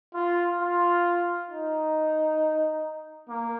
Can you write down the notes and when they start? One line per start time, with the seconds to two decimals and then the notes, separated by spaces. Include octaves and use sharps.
0.14 F4
0.59 F4
1.49 D#4
3.29 A#3